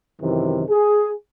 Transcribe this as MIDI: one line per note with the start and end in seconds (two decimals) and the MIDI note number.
0.21 0.63 42
0.21 0.63 48
0.21 0.63 51
0.21 0.63 52
0.69 1.11 68